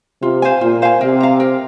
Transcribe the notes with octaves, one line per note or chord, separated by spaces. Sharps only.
C3 F4
C5 F5 G#5
A#2 F4
C5 F5 G#5
C3 A#4
F5 A#5
A#4